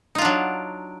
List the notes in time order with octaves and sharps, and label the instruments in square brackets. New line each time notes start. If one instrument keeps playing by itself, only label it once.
[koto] D#4
F4
D4
F#3